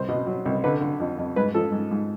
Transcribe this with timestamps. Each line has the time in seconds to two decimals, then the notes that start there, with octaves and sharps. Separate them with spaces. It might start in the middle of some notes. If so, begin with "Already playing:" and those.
Already playing: C2 C5
0.09 B2
0.27 F#3
0.46 C2
0.64 D3 B4
0.81 D3
1.00 F2
1.18 F2
1.36 G#2 B4
1.54 F3 A4
1.72 G#2
1.91 G#2